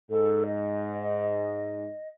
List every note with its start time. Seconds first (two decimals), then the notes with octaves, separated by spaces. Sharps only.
0.11 G#2 A4
0.46 D#5